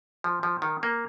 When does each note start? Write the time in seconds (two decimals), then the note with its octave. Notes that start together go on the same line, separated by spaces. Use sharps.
0.24 F3
0.43 F3
0.62 D#3
0.83 A#3